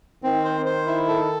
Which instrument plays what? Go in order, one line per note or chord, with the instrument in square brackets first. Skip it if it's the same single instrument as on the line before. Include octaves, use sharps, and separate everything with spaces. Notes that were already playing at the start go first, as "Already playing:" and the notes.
[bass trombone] D#3 [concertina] C4
[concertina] C5
C5
E4
A4